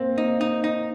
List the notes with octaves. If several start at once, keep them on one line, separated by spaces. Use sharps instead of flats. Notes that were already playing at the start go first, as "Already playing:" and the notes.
Already playing: A#3 C4
A#3 D#4
D#4
D#4